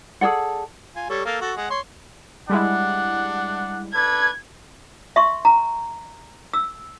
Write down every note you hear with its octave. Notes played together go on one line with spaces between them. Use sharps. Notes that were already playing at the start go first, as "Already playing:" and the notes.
G#4 A4 D5 F#5
F4 G#5
G3 A4 C#5
A#3 A4 F5
F#4 A4
G#3 F#5
C#5 C6
G3 G#3 D4 E4 F#5
D4 A4 B4 G#6
E5 C6 C#6
A#5
E6